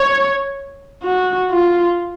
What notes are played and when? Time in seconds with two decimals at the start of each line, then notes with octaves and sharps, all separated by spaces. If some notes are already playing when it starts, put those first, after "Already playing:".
Already playing: C#5
1.03 F#4
1.51 F4